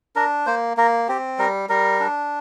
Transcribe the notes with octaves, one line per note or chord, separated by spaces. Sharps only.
D4 A#4
A#3 C5
A#3 A#4
C4 G4
G3 A#4
G3 A#4
D4